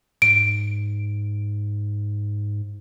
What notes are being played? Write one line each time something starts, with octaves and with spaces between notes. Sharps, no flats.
G#2 D7